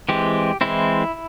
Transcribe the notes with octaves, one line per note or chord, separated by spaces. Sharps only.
E3 G#3 C4 G4
E3 G#3 C4 E4